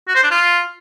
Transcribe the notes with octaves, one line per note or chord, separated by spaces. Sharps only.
F#4
C5
D4
F4